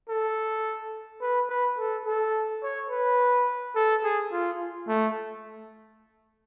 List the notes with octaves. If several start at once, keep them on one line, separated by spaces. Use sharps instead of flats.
A4
B4
B4
A4
A4
C#5
B4
A4
G#4
F4
A3